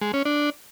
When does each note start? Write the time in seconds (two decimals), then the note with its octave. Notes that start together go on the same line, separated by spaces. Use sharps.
0.01 G#3
0.13 C#4
0.25 D4